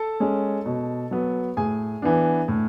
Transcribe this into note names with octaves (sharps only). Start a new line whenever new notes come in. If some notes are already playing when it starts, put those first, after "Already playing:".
Already playing: A4 A5
G#3 C#4
B2
F#3 B3
A2 G#4 G#5
E3 B3 D4
A2